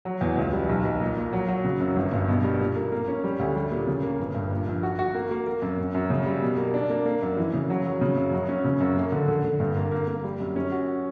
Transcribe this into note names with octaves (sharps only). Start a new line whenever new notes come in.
F#3
E2
C#2
G3
B1
B1
A#2
A#2
F#3
F#3
C#3
F#2
G1
G2
B2
G3
A#2
A#3
A#3
C#4
G3
D2
G3
A#2
C#3
A#3
G1
G2
A#2
A#1
F#4
F#4
A#3
A#3
A#3
F#2
F#2
F#2
C#3
G3
B2
A#3
D4
A#3
A#3
F#2
E3
C#3
F#3
F#3
C#3
F#2
F#3
C#4
C#3
F#2
A#3
D3
D3
D3
G2
A#3
A#3
A#3
G3
F#2
C#4
F#4